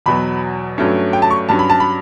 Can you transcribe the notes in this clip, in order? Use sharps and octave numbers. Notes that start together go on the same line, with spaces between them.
E2 B2 F#3 B5
G2 F#3 A3 C#4
G5
A5
C#6
G2 F#3 C#4 A5
B5
A5
B5